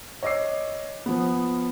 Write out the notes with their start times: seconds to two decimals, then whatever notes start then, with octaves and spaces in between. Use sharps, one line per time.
0.23 C#5 D#5 D6 E6 C7
1.06 F3 B3